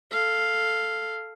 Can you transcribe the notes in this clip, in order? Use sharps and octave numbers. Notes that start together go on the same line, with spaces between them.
A4 F5